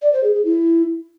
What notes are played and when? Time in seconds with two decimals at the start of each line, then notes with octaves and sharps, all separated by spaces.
0.02 D5
0.13 C5
0.23 G#4
0.34 G#4
0.45 E4